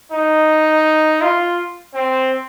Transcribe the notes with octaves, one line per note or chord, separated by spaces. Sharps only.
D#4
F4
C4